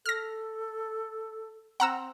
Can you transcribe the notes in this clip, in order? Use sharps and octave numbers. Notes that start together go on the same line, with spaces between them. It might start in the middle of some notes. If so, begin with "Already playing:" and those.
A4 F6 A#6
C4 F#5 A#5 E6